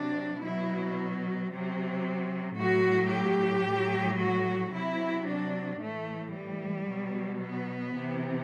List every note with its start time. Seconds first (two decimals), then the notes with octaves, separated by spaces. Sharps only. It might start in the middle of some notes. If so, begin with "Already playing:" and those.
Already playing: C3 F#3 D4
0.42 B2 F#3 E4
1.51 C3 F#3
2.58 A2 F#3 F#4
3.12 G4
3.66 A2 F#3
4.20 F#4
4.73 C3 F#3 E4
5.27 D4
5.81 A2 E3 A3
6.34 G3
6.88 B2 F#3
7.42 B3
7.96 C3 E3